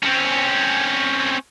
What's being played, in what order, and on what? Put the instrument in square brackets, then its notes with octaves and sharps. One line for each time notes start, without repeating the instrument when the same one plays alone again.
[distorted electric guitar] C4 C#4